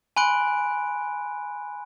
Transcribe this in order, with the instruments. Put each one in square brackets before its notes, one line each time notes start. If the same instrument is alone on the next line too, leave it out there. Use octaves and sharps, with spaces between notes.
[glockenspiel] G#5 B5 C6 F#6 D7